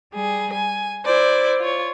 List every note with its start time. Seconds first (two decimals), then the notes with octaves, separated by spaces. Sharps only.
0.13 G3 G#4
0.53 G#5
1.05 E4 C5 D5
1.60 F4 C#5